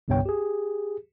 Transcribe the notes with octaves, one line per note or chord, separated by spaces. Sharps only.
G1 C2 G2 B3 C#5 G5
G4 G#4